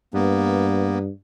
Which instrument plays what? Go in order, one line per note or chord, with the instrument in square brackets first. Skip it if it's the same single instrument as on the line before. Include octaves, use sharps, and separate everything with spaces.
[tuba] G2 [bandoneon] A#3 B3